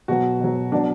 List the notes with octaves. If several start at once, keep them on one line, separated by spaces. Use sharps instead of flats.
B2 F#3 F#4
B2 F#3
B2 F#3 D4